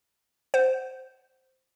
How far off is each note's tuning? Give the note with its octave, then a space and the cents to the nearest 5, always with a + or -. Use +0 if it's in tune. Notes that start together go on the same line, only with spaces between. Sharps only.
C5 +0 F#5 +20